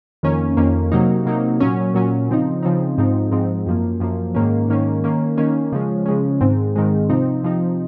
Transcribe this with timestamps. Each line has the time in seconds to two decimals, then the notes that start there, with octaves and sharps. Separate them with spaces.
0.23 F2 D#3 A#3 C#4
0.57 F2 D#3 A#3 C#4
0.92 C3 F#3 A#3 D#4
1.25 C3 F#3 A#3 D#4
1.60 A#2 F#3 C#4
1.94 A#2 F#3 C#4
2.29 C#3 F3 C4 D#4
2.63 C#3 F3 C4 D#4
2.98 G#2 F3 C4 D#4
3.32 G#2 F3 C4 D#4
3.67 F#2 F3 A#3
4.00 F#2 F3 A#3
4.35 G#2 D#3 A#3 C#4
4.68 G#2 D#3 A#3 C#4
5.04 D#3 A#3 C#4
5.38 D#3 A#3 C#4
5.72 C#3 F3 G#3 C#4
6.06 C#3 F3 G#3 C#4
6.41 G#2 D#3 G#3 C4
6.75 G#2 D#3 G#3 C4
7.10 C3 F3 C4 D#4
7.43 C3 F3 C4 D#4